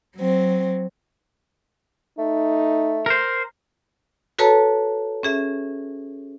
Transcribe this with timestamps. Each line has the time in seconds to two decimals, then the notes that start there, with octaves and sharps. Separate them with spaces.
0.16 F#3 C4
2.18 A3 D#4
3.06 A#4 C5
4.39 F#4 A4 B4 C#5 A5 A#5
5.23 C#4 G#4 E5